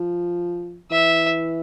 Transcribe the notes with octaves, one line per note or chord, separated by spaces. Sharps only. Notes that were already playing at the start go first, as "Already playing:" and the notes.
Already playing: F3
E3 E5